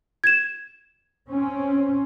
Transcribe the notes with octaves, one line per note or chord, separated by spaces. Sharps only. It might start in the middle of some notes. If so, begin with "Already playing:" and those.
G#6 E7
C4 C#4